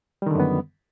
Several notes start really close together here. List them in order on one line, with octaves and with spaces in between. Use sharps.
G3 D#3 D3 F#2 B3